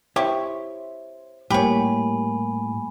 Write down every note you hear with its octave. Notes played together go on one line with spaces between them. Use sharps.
E4 G4 C5 C#5 E5 C#6
A2 G3 A#3 G4 C#5 G#5 B5